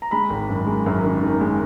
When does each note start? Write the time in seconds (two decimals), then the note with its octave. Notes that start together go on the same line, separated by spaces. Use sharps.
0.02 A#5
0.11 G#3 B5
0.30 G#1
0.49 F#2
0.67 G#3
0.86 F#2
1.04 D#3
1.23 D#3
1.41 G#3